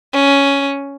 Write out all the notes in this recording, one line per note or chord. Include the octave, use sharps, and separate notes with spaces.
C#4